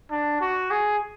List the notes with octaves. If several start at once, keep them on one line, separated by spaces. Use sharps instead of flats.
D4
F#4
G#4